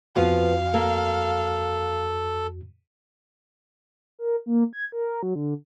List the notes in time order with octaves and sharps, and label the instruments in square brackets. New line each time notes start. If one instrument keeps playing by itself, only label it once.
[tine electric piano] F2 F#4 [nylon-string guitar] F3 B3 [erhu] F5
[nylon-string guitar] A#3 [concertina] A4
[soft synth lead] A#4
A#3
G#6
A#4
F#3
D3